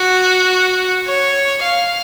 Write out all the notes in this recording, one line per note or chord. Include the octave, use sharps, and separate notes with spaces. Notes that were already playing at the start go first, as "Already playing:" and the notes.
Already playing: F#4
C#5
F5